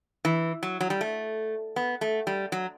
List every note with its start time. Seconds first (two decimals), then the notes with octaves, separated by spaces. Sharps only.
0.25 E3
0.63 F#3
0.81 F#3
0.90 G3
1.01 A3
1.76 B3
2.01 A3
2.27 G3
2.52 F#3